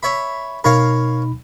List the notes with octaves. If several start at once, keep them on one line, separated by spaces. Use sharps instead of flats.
C#5 E5 B5
B2 D#4 A#4 C#5 F5 B5